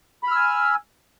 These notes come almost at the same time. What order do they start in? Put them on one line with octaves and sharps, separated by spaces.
B5 F6 E6 G#5